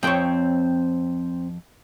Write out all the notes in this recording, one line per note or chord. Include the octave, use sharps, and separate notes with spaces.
F2 C4 C5 C#5 G5